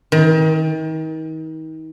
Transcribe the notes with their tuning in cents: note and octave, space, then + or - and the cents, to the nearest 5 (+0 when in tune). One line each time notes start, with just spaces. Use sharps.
D#3 +35